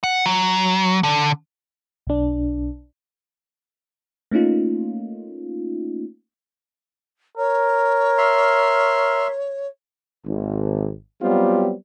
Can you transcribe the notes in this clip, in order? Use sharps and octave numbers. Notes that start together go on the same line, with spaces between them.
F#5
F#3
D3
B1 D4
A3 A#3 C#4 D#4 F4
A#4 C#5
E5 C6 F6
G#1
F#3 G3 B3 C4 F4 G4